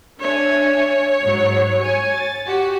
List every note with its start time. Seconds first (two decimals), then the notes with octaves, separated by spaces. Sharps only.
0.20 D4 C#5 E5 G#5
1.22 G#2 F#3
1.78 G#5 C#6
2.14 A6
2.47 F#4 G4